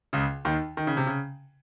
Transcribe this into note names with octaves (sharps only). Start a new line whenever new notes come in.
C#2 C#3
D#2 D#3
D#3
C#3
C3
C#3